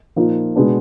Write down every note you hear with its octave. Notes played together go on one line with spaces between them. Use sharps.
A#2 F3 A#3 D#4
B2 G#3 B3 D4